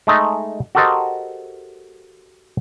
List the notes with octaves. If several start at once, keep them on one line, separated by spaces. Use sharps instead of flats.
G#3 A3 D#4
F#4 G4 A4 A#4 C5 D#5